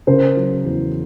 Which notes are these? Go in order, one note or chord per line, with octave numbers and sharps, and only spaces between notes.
C#3 A#4 C5
F#3
E2